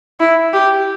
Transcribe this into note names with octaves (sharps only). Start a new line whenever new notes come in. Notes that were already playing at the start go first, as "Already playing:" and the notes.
E4
G4